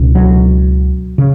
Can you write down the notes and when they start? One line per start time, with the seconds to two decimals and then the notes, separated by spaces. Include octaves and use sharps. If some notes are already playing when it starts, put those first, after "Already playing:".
Already playing: C#2 B2
0.15 F#3
1.18 C#3